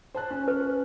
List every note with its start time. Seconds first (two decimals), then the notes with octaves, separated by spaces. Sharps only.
0.15 C5 A5 F#6
0.30 C#4
0.48 B4